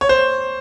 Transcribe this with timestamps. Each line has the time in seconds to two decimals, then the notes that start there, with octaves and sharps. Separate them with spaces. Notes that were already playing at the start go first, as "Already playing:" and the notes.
0.01 C#5
0.09 C5